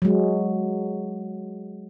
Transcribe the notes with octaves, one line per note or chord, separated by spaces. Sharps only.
F#3 G#3